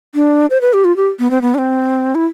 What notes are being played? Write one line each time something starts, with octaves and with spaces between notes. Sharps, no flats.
D4
C5
B4
G4
F4
G4
B3
C4
B3
D4
C4
E4